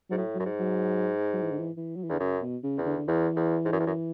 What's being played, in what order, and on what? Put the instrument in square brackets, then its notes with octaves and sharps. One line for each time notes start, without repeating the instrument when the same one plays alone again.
[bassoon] G#2 [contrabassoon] F#3
[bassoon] A2
[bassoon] F#2 [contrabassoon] F#3
[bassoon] G#2
[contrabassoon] F#3
F#3
E3
D3
E3
E3
F#3
E3
[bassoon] E2 [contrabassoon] D3
[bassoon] F#2 [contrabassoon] C#3
[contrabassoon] B2
C#3
[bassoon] E2
[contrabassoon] D3
D3
[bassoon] E2 [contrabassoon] E3
[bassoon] E2
G#2
F#2
E2
F#2